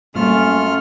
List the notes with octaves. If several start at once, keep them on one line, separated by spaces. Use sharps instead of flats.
F#2 G3 A3 A#3 C4 C#4 F4 F6